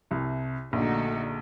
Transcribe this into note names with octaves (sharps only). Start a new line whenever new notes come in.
C2 C3
A#1 A#2 D3 A3 D#4 F#4